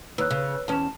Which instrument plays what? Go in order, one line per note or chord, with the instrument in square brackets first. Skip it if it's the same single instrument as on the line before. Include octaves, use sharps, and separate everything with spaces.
[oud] D#2 [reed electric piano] B4 C#5 [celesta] E6 F#6
[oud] C#3
[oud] E2 C#4 [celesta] A5 E7